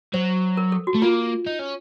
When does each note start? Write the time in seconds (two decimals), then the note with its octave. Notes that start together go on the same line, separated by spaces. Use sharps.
0.14 F#3 C5
0.57 A#4
0.72 A4
0.87 F#4
0.95 A3
1.02 A#3 F4
1.46 D#4
1.59 C#4